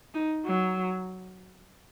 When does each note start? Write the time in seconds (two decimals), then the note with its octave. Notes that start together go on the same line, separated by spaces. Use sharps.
0.14 D#4
0.45 F#3